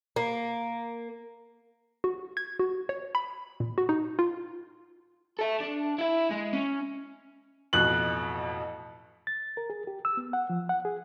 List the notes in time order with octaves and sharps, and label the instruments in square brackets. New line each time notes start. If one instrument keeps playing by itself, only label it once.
[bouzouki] A#3
[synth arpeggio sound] F#4
G#6
F#4
C#5
B5
A#2
F#4
D#4
F4
[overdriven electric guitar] A4 E5
D4
E4 E5
G#3
C#4
[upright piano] A1 F2 B2 [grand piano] F#6 F#7
[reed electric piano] A6
A#4
G#4
G4
E6
B3
F#5
F3
F#5
G#4